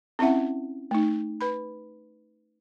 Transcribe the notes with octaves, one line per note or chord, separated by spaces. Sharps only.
C4 C#4 E4 E5 F#5
A3 D#4
B4 B5